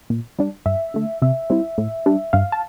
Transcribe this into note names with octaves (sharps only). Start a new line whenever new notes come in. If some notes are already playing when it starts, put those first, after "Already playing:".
A#2
G3 D4
G2 E5
D3 A3
C3 E5
G3 C4 E4
A2
G3 D4
G2 F5
A5